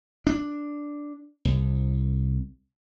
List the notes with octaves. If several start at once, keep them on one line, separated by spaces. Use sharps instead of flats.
D4
C2